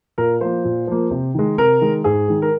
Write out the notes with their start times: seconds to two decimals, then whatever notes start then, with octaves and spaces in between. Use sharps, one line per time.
0.18 A#2 A#4
0.41 F3 A#3 C5
0.65 A#2
0.87 F3 A#3
1.11 C3
1.35 D#3 G#3
1.58 C3 A#4
1.81 D#3 G#3
2.04 G#2 G#4
2.28 D#3 G#3
2.42 A#4